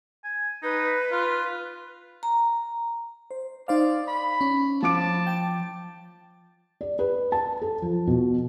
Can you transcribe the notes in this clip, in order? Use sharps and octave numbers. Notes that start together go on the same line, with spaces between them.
G#5
D#4 B4
F4
A#5
C5
D#4 C5 D5 F5
B5
C#4
F3 A5 D6 D7
G5 A6
D5
B4
A5
A4
F3
B2